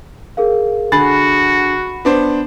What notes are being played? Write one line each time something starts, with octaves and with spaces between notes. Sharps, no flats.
G#4 A#4 F5
D3 F#4 G#4 B5 A6
B3 D4 C5